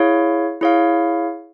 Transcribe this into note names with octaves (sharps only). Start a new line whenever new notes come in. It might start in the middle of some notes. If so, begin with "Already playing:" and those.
Already playing: E4 G#4 C#5 F5
E4 G#4 C#5 F5